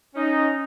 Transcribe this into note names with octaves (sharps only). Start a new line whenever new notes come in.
C#4 D#4